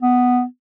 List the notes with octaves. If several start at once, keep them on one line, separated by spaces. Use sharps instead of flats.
B3